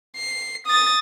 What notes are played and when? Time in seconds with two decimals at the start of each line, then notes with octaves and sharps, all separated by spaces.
0.17 C7
0.67 D#6 A6